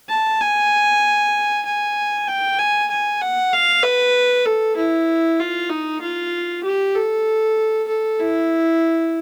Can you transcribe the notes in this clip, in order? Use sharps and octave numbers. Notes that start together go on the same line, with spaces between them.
A5
G#5
G#5
G5
G#5
G#5
F#5
F5
B4
A4
E4
F4
D#4
F4
G4
A4
A4
E4